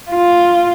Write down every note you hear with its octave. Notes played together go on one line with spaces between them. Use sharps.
F4